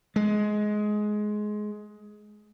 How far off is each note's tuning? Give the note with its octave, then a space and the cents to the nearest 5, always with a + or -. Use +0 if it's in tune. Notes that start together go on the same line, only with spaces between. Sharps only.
G#3 +15